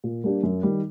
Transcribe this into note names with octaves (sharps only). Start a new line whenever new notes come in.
A#2
G3 A#3 D4 G4
F#2
D#3 G3